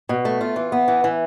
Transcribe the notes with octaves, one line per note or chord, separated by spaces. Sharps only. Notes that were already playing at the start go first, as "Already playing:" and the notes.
B2
A3
F4
E3
B3
E3
E3